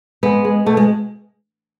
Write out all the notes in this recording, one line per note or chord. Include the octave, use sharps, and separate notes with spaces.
G#3 B3
G#3
B2 A3
G#3